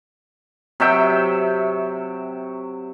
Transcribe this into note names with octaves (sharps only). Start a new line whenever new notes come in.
C3 F#3 E5 G5